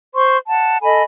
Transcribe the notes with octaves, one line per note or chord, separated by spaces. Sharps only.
C5 C6 C#6
F#5 A5
A4 D#5 G#5 B5